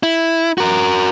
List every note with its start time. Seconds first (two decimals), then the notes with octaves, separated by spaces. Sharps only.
0.03 E4
0.58 F#4 A#4